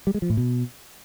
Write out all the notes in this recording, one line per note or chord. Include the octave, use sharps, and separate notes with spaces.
G3
G#3
F3
A2
B2